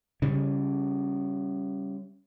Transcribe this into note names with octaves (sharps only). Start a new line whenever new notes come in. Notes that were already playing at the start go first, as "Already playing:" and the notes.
C#3 G3 C#4